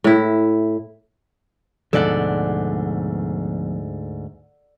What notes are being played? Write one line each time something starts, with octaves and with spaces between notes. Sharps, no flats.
A2 E4
D2 G#2 B2 F3 G#3 A4 D5 F#5